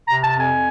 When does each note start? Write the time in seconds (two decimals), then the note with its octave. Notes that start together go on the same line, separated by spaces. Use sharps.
0.07 C3 A#5
0.24 A5
0.33 F2
0.40 G#5